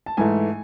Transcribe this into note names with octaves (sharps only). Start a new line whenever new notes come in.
A5
G#2 E3 A3 G#5